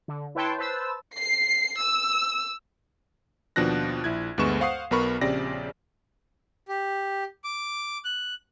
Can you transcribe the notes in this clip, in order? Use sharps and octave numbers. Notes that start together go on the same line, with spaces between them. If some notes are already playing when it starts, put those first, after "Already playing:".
D3
E4 B4 C#5 G5 A5 C6
B4 C5 A5 E6
C7
E6
D#2 B2 F3 D4 F#6 A#6
A#1 E4 F#6 G#6
D2 G2 G#3 B3 C#6 E7
C5 F5 F#5 C#6 D#6 C7
B1 B3 A#4 B5 C#6
A#1 C#3 C4 G4 D5 A#6
G4
D6
F#6